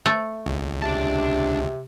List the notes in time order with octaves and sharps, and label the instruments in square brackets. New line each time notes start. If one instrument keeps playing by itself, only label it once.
[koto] A3
[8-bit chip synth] C#2
[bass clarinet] C3 [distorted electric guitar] D4 A5